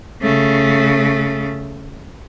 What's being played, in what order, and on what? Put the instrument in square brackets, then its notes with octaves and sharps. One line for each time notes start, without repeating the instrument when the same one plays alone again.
[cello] C#3 A3